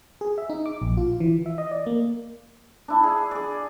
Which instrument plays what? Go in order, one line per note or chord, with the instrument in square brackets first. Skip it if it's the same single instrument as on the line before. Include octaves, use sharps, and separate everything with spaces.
[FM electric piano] G#4
E5
D#4
D6
A#1
F4
E3
E5
D#5
D5
A#3
[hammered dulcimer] D4 E4
G#4
G#4 D5